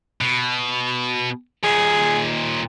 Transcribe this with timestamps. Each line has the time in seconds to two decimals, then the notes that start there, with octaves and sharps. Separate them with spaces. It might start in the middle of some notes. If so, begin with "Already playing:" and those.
0.21 B2
1.64 D#2 A#2 G#4